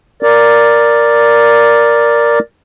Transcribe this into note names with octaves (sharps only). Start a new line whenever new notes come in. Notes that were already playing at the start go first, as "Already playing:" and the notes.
A#4 D5